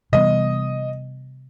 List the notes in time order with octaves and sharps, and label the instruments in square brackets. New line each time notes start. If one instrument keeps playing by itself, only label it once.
[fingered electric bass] C3 E3 G3 B3 [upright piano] D#5